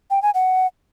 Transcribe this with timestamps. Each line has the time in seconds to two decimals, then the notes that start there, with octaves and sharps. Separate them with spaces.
0.10 G5
0.22 G#5
0.34 F#5